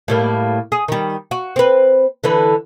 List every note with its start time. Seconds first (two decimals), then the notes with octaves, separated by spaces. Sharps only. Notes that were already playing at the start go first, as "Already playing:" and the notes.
0.08 A2 G3 A#3
0.72 G#4
0.88 D#3 G3
1.31 F#4
1.56 C4 B4
2.24 D3 E3 B4